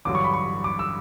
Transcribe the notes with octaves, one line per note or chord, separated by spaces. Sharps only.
A1 G2 D3 F#3 D6
C#6
B5
C#6
D6
E6